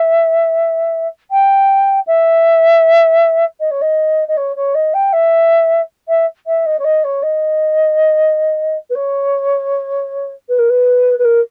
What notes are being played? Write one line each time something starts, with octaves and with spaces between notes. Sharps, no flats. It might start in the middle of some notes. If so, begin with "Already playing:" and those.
Already playing: E5
G5
E5
D#5
C#5
D#5
D#5
C#5
C#5
D#5
G5
E5
E5
E5
D#5
C#5
D#5
C#5
D#5
B4
C#5
B4
A#4
B4
B4
A#4